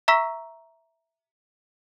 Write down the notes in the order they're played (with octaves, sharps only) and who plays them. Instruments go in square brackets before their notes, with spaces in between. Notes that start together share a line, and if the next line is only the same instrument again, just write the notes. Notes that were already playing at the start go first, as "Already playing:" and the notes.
[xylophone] E5 A#5 C#6 E6 B6